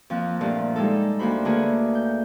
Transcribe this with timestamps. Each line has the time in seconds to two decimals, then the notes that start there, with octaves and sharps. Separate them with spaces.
0.10 F2 F3 A#3 F#6
0.41 G2 A#2 F3 A3
0.76 G3 G#3 D#4 A4
1.19 D2 A#3 F#4 C5 B5
1.45 D3 A3 A#3 F#4 G#4 B4
1.95 G6